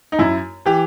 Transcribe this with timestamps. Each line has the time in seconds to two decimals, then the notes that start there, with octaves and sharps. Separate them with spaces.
0.12 D#4
0.19 F#2 E4
0.66 E3 G4